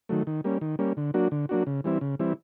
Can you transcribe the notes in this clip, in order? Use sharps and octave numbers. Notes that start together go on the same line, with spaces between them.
D#3 F#3 A3
D#3
G3 A#3 C#4
D#3
G3 A#3 C#4
D3
F#3 A#3 D4 F#4
D3
F#3 A#3 D4 F#4
C#3
E3 G3 C4 E4
C#3
E3 G3 C4 E4